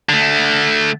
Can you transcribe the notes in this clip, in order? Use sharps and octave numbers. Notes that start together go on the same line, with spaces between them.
D3 A3